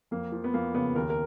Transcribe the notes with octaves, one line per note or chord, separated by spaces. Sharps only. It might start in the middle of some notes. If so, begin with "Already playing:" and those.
F2 A#3
F3
B3
F2 A#3
C#3 B3
D#2 A#4
A#4